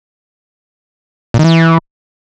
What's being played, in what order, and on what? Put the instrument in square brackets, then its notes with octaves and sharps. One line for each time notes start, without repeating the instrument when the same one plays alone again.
[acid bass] A#2
D#3
E3